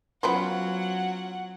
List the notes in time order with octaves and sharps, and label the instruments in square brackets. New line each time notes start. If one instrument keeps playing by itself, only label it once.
[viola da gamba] F#3 [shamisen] B3 B4 C5 [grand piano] C#4 F4 [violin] F#5